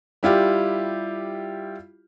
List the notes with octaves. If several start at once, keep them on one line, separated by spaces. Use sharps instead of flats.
G3 E4 F4 G4